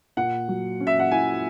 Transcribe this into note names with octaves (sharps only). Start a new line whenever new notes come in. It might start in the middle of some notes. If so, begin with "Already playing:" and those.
A#2 F#5
F#3
C#4
E5
F#5
E4 G#5